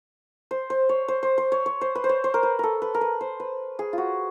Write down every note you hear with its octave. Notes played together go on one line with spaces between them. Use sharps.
C5
C5
C#5
C5
C5
C5
C#5
C#5
C5
B4
C5
C#5
C5
A#4
B4
A4 A#4
B4
A#4
B4
C5
B4
G#4
F4 F#4